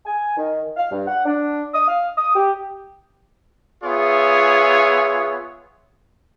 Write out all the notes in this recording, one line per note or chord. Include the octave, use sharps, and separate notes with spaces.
G#5
D#3
F5
G2
F#5
D4
D#6
F5
D#6
G4
B3 F4 G#4 C#5 E5